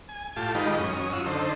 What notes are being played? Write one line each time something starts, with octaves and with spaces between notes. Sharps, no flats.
G#5
A2 F4 G4 A5
D#3 G#3 D#4 F4 G4 B4
F#2 C#4 D#6
F4 F#5 E6
D3 D#4 A4 C5